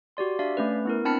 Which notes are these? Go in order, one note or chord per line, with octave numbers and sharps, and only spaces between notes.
F#4 G4 D5 C6
D4 D5 E5 F5
A3 C#4 B4
B3 E4 A#4
C4 D4 A5 B5 F6 C#7